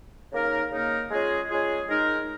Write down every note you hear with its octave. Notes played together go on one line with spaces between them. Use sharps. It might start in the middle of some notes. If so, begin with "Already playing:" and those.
C#3 A#3 D#4 A#4
C#3 A#3 D#4 A#4
G#3 C#4 F4 G#4
G#3 C#4 F4 G#4
G#3 D#4 A#4